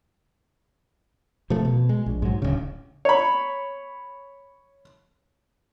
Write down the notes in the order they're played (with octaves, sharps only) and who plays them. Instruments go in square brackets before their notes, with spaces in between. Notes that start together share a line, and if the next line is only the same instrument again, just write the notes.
[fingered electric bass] C3 F3 A3
B2
G#3
A#1
G#2 F#3
D1 C#3
[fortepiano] C#5 B5